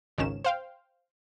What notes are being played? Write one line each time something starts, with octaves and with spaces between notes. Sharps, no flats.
G#1 C#2 D#3 C#4 E7
C5 F5 G5